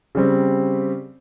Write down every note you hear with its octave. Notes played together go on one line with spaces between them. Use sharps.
C#3 G3 C4